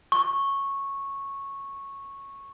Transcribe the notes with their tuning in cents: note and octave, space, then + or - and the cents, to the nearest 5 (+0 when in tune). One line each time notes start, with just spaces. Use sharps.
C#6 -10